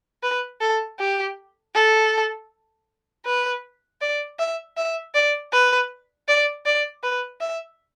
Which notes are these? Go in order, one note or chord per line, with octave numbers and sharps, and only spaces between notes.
B4
A4
G4
A4
B4
D5
E5
E5
D5
B4
D5
D5
B4
E5